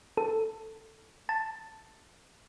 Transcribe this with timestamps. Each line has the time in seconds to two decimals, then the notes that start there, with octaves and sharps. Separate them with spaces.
0.17 A4
1.29 A5